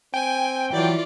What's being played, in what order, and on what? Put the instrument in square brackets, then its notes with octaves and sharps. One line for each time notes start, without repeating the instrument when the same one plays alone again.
[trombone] C4 [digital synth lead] G5 [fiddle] G#5
[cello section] E3 [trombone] F#3 [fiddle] F4 D5